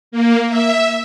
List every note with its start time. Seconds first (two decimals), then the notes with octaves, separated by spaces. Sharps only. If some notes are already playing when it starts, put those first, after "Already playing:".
0.12 A#3
0.49 E5